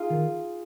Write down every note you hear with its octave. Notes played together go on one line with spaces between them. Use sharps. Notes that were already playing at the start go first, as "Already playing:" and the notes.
Already playing: D#4 F4 G#4
D#3